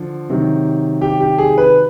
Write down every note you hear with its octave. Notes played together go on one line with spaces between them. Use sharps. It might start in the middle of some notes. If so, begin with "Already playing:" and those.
Already playing: D3 F3
C3 D#3 F#3
G4
G4
G#4
B4